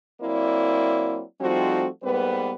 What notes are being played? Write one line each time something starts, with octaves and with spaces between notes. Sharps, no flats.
F#3 A#3 C4 E4 D5
F3 G3 A3 C4 D#4 F#4
G#2 G3 A#3 B3 B4 C5